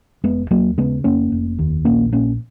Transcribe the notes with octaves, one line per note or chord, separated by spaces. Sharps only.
F1 G#3 B3
D#2 F#3 A#3
C#3 G#3 B3
F1 A#3 C#4
F1
D#2
A#1 A#3 C#4
A#2 A#3 C#4